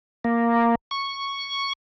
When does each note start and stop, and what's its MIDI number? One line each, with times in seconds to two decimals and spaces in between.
0.24 0.75 58
0.91 1.73 85